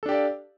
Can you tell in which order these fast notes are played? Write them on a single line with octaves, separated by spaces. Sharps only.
A4 D4 G4 D5 F5